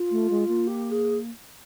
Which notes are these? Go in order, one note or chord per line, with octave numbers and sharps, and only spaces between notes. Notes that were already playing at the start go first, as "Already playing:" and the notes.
Already playing: F4
A3
G#3
A#3
G4
G#4